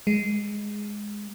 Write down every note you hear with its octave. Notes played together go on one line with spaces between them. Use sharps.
G#3